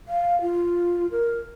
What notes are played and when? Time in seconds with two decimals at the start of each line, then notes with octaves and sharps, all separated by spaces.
0.08 F5
0.41 F4
1.12 A#4